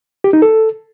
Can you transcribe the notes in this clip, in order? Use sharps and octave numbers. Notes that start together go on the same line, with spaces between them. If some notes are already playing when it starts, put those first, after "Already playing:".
G4
D#4
A4